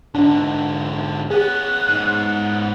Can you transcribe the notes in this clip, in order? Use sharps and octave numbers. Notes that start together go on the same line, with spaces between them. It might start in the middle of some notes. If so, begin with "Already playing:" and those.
G#2 D3 D4
B3 C#4 G#4 F#6
G#2